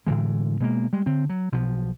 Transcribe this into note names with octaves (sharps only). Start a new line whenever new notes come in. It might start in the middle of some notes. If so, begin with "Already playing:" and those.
A2 D3 E3 G#3
B2 G#3 A#3
G3 G#3
D3 C4
F#3
B1 B2 F3